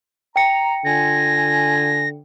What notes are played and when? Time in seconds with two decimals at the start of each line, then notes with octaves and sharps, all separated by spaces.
0.36 G5 A#5 C#7
0.85 D3 F4 G#5 A#6